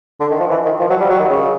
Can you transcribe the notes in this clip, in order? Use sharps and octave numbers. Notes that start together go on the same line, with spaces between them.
D3
D#3
F3
E3
D#3
F3
F#3
G3
F#3
D#3
C#3